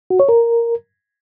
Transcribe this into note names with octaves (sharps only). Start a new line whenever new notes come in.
F#4
C#5
A#4